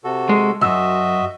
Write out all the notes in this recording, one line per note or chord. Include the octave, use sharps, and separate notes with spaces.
C3 F#4 A4
G#3
B1 F#2 F#4 D#5 E5 E6